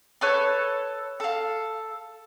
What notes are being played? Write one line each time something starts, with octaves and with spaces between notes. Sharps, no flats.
A4 B4 C#5
A4 F5